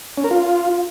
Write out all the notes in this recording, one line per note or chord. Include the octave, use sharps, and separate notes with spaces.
C#4
A#4
F4